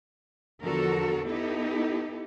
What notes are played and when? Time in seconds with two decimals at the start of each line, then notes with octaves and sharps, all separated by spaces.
0.62 E2 D3 F3 F#4 A4 A#4
1.27 B3 D#4 E4 G4 A4